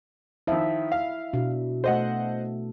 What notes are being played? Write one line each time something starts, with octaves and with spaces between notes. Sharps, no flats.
D#3 F3 E4 E5
F5
B2 D4
A3 A4 C5 D#5 F#5